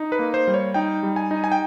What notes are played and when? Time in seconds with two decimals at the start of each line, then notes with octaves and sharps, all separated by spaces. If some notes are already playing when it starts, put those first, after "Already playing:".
Already playing: D#4
0.12 B4
0.19 A#3
0.34 C5
0.47 G3
0.54 C#5
0.74 D#4 G5
1.03 G3
1.16 G#5
1.31 D#4
1.44 G#5
1.52 G5